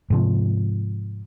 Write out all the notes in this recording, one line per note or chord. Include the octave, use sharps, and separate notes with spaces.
G#2 C3 F3